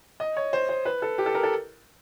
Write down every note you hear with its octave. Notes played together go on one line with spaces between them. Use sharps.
D#5
C#5
C5
C5
B4
A4
G4
A4
A#4
A4